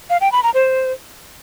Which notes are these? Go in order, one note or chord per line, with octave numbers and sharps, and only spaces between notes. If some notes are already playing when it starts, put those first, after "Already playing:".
F5
G5
B5
A#5
C5